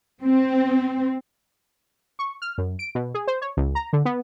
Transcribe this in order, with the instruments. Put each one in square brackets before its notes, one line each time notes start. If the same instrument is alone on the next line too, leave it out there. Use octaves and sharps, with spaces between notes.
[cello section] C4
[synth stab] C#6
F6
F#2
D7
B2
G#4
C5
C#5
C#2
A#5
D3
B3